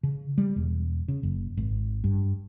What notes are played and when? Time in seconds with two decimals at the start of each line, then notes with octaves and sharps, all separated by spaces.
0.03 C#3
0.38 G3
0.56 E1
1.08 C#3
1.23 F#1
1.57 G#1
2.04 G2